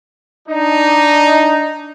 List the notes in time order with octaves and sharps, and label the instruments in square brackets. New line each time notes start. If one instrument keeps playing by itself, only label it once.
[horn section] D4 D#4